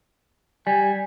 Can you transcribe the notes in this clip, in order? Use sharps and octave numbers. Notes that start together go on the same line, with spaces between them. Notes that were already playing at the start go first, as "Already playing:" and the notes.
G3 G#5